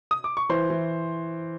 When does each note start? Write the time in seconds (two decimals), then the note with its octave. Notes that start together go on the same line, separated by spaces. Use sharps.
0.11 D#6
0.24 D6
0.37 C#6
0.49 E3 C5 C6
0.70 E3